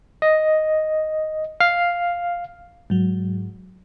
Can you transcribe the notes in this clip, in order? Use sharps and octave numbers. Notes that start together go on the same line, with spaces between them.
D#5
F5
G#2 F#3